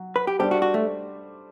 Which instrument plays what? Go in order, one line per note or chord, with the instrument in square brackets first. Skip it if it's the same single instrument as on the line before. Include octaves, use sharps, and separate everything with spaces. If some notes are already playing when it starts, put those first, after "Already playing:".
Already playing: [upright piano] F#3 F#4
[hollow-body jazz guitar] B4
G4
[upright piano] G3 D4 A4 C5 [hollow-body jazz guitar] G4
[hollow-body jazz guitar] F#4
F#4
A3